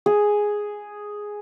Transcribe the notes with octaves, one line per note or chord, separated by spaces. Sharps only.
G#4